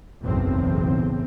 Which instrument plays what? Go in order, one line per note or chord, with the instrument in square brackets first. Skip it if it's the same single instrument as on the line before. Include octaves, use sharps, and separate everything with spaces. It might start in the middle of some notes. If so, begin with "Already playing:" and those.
[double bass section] F#1 B1 E2 A2 C4